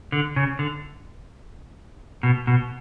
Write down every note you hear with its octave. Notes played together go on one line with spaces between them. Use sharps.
D3
C#3
D3
B2
B2